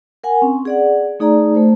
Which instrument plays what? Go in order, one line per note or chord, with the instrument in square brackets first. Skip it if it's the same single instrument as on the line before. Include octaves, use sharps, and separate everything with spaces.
[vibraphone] A#4 F#5 G#5
C4 C#4
G#4 D5 F#5
A3 D#4 G#4 D5 A#5
A3 C5